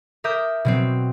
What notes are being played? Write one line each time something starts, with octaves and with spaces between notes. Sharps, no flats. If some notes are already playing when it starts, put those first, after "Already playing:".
A#4 E5 D6 D#6 G6
B2 F#3 C4